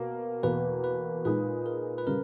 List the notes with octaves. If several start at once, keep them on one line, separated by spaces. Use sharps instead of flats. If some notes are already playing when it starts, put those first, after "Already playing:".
Already playing: B2 A#3 A#4
E2 B2 A#3 B4
B4
A#2 G#3 D#4 B4
A#4
B4
C#3 G3 A#4